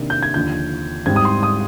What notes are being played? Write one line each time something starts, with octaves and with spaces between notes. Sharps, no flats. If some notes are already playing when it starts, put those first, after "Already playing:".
Already playing: C3 D#3 A#3 D4
G6
G#6
D#2 D3 F3 G6
G#2 G3 C4 G#6
D#6
C6
D#6